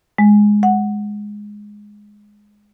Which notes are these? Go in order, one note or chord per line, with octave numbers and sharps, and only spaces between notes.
G#3
F#5